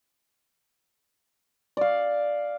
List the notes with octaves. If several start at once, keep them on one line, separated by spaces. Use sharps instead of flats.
D5 F5